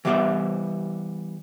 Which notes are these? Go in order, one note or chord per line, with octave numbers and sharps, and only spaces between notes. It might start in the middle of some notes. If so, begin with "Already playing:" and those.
E3 G3 B3 G4 C5 E5